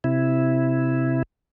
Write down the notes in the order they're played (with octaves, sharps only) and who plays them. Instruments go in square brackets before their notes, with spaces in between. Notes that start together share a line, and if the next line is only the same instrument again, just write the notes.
[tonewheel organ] C3 E4